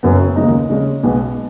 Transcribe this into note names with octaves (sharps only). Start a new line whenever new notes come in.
F#1 F#2 F#3 B3
D#2 C#3 G#3 D#4
C#3 G#3 C#4
B1 B2 G#3 B3 G#4